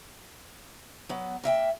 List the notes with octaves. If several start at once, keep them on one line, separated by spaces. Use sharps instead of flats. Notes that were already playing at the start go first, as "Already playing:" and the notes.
F#3 B3
A#3 E5 F#5 G5